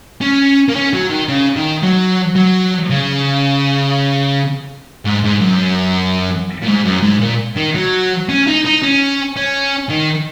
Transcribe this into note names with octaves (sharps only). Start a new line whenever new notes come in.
C#4
A#3
C#4
F#3
D#3
C#3
D#3
F#3
F#3
C#3
G#2
G#2
F#2
A#2
G#2
F#2
G#2
A#2
D#3
F#3
C#4
D#4
D#4
C#4
C#4
D#3